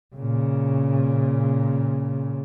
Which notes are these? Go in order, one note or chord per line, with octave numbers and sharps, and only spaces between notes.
A#2 C#3